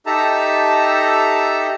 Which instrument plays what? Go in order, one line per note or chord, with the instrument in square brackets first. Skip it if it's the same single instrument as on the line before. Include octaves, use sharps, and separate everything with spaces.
[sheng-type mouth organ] D#4 G4 A4 E5 A5 A#5